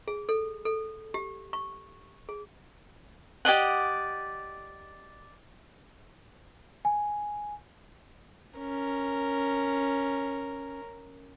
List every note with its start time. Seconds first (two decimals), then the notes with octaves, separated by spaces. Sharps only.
0.08 G#4
0.29 A4
0.65 A4
1.14 G4
1.53 C#6
2.29 G#4
3.45 G4 D5 D#5 F#5
6.85 G#5
8.58 C#4 A#4